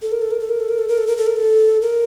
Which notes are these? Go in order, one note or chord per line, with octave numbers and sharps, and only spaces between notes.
A4
A#4
A4
A#4
A4
A#4
A4
A#4
A4
A#4
A4
A#4
A4
A#4
A4
A#4